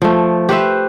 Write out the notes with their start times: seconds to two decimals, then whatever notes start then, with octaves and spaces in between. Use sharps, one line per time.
0.02 F3 A3
0.49 G4 B4 C5 E5